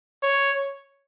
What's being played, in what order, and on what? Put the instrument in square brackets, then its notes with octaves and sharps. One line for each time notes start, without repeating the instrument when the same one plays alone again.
[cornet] C#5